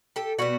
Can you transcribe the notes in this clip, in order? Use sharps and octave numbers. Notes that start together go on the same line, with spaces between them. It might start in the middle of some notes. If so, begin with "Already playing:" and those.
G4 A4
B2 G3 B3 E4 F#4